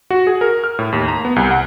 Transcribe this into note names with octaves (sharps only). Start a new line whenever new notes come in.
F#4
G#4
A#4
F6
A2
D#2
A#5
B3
C2
F#5